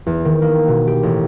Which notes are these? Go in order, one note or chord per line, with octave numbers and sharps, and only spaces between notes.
E2
D#3
A#3
B2
G4
A1